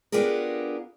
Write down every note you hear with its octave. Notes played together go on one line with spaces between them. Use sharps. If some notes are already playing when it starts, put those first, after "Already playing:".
B3 D4 F4 G4 G#4 A#4